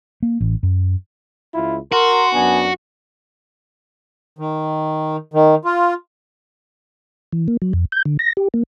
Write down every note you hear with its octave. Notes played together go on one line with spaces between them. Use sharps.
A#3
A1
F#2
C#2 E4 F4
F#4 A#4 C6
F#2 B3 D4 G#5
D#3
D#3
F4
E3
A#3
F#3
F2
G6
D3
A#6
G4
A#3